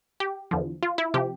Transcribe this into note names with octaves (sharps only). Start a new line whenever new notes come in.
G4
E2 D3 F3
F4
E4
C3 F3 G4